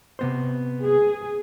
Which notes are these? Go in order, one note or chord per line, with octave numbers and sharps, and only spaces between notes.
C3 B3 C5
G#4